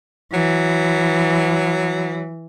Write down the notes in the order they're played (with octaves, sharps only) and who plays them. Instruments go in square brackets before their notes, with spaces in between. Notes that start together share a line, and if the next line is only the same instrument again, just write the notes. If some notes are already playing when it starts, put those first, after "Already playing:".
[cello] E3 [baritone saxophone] F#3